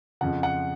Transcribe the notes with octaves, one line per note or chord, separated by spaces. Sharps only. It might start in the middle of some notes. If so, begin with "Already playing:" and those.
F2 C#3 F3 F#5
F#5